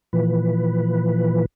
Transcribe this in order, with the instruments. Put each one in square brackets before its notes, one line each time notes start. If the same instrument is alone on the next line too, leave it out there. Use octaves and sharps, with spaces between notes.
[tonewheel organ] A#2 E3 F3 B4